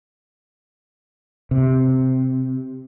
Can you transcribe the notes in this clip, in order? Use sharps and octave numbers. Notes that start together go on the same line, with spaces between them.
C3